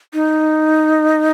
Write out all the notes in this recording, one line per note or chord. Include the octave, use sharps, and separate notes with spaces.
D#4